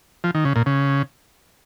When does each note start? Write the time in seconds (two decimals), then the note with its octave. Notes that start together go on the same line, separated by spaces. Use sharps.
0.24 F3
0.35 D#3
0.45 C#3
0.56 A#2
0.66 C#3